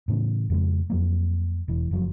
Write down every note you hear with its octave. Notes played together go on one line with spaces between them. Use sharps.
A2 C#3 E3
F2 C#3 G#3
F2 F#3 A#3
E1 E3
F#1 F3 F#3